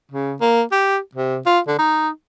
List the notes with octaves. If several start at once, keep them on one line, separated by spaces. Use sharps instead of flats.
C#3
A#3
G4
C3
F4
D3
D#4